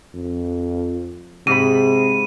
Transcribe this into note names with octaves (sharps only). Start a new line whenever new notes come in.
F2
G#2 C3 B5 D#7